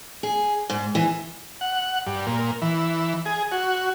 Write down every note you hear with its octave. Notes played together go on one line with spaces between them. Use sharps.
G#4
G#2
E3
F#5
G2
A#2
E3
G#4
F#4